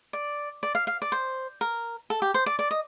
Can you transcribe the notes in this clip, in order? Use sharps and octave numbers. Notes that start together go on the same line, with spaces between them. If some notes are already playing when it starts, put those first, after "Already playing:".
D5
D5
F5
F5
D5
C5
A#4
A4
G4
C5
D5
D5
D#5